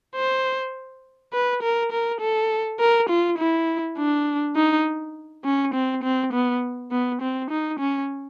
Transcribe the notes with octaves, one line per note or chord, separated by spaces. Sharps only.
C5
B4
A#4
A#4
A4
A#4
F4
E4
D4
D#4
C#4
C4
C4
B3
B3
C4
D#4
C#4